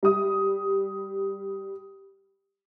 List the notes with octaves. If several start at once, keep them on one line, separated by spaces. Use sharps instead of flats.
G3 D#6